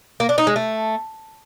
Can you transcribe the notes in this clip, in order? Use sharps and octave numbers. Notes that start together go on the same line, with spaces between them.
A#3
D4
D#4
G#3
A3